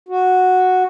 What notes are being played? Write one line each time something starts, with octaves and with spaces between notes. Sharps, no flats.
F#4